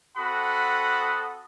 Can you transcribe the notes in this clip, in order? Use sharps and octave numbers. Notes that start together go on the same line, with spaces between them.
C4 F#4 A4 F#5 B5 D#6